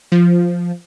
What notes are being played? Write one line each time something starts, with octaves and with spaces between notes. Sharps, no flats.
F3